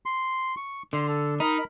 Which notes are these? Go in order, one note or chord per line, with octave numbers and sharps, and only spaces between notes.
C6
C#6
D3 C6
A4
D#4 A#4 B5